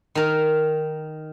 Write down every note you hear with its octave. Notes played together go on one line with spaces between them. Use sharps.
D#3 A#4